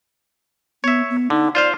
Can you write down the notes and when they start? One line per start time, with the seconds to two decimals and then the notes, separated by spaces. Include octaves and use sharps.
0.84 B3 C#5 E5
1.10 B3
1.30 D3 D#4
1.55 F4 C5 D5 F5